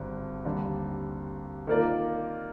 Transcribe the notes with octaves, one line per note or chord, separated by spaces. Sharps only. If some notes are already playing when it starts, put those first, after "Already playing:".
Already playing: G#1 G2 D3
D#2 D3 G3
D#3 A#3 F4 A#4 D5